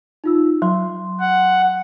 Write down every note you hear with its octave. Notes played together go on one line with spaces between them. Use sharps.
D#4 F4 E6
F#3 C6
F#5